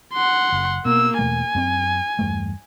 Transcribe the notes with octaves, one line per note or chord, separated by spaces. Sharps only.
F#5 C6
F#1
B2 A#3 E6
E2 B2 A3 G#5
F#2 B3 C4
E2 G2 A3